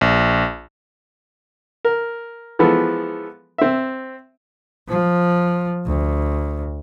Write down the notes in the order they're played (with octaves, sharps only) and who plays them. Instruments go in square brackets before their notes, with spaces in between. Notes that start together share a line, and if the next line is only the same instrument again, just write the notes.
[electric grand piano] A#1
[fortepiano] A#4
E3 F3 G#3 B3 A4
C4 E5
[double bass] F3
D2